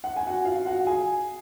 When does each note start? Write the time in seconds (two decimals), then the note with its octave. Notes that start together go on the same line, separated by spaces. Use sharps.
0.04 F#5
0.16 G#5
0.27 F#4 F#5
0.45 F4 F5
0.66 F#4 F#5
0.87 G#4 G#5